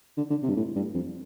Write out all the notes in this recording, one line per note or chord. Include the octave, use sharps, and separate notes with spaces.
D3
D3
C3
G2
A2
G2
F2